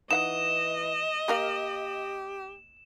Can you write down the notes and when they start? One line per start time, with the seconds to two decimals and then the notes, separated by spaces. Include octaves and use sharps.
0.11 E3 D#4 D#5 F5 F#5 E7
1.28 A#3 G4 A#4 F5